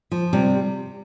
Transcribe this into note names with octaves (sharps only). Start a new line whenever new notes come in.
F3
C3 G3